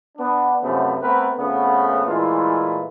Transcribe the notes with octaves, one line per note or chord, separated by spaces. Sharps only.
B3 D4
F#2 C3 F3 A3 B3 C#4
A3 B3 C4 A#4 B4
F2 C#3 A3 B3
A#2 E3 G#3 A3 E4 F4